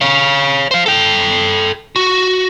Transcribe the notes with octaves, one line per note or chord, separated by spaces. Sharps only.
C#5 F5
C5 F5
A4 G5
F#4